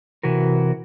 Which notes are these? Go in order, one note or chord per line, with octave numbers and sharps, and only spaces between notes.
C3 E3 F#4 A#4